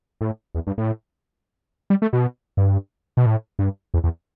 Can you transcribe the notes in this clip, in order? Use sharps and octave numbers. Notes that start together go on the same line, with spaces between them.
A2
E2
G2
A2
G3
A3
B2
G2
B2
A2
G2
E2
E2